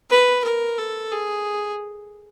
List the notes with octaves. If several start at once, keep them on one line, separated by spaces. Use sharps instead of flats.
B4
A#4
A4
G#4